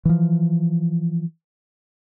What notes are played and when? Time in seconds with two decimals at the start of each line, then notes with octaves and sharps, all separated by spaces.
0.05 E3 F3